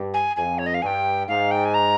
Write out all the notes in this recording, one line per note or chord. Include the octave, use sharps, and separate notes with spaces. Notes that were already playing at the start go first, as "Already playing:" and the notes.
Already playing: G2
G#5
F2 G#5
C#5
D#5
F5
G2 G5 G#5
G#2 F5
G5
G#5
A#5